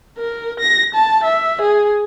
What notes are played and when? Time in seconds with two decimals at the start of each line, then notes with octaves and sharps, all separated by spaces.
0.18 A#4
0.60 A#6
0.95 A5
1.24 E5
1.62 G#4